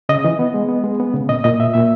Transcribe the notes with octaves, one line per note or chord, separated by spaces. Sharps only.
C#3 D#5
E3
B3
G#3
B3
G#3
B3
C#3
A#2 D#5
A#2 D#5
A#2 E5
A#2 E5